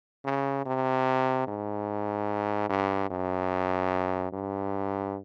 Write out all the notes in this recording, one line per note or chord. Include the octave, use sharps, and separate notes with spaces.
C#3
C3
G#2
G2
F#2
G2